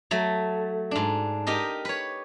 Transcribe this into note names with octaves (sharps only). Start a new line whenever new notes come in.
F#3 A3
G#2 D4
D#4 G4 A#4 D#5
B4 C#5